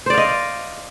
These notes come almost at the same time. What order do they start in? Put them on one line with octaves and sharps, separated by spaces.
C5 D5 F5 D#5